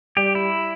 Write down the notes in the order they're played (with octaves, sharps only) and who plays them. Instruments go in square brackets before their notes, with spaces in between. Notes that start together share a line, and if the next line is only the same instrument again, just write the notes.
[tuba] G3 [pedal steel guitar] G4
[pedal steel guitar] E4